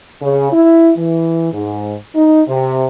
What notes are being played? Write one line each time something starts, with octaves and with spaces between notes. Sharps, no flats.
C#3
E4
E3
G#2
D#4
C3